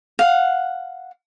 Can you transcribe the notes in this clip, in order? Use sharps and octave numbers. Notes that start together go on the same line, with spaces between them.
F5 F#5